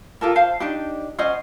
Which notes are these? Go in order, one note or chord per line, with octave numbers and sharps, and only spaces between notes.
F4 G4 A4 A#4
C5 F5 A5
D4 D#4 G4
C#4 C5 D#5 F#5